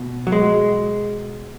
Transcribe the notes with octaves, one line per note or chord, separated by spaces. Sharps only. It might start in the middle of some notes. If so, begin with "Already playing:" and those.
Already playing: B2
F#3
G#3